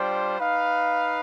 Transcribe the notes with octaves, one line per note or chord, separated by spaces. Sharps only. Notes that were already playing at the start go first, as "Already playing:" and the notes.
Already playing: G3 D4 F4 C5 G5
D#4 B4 F5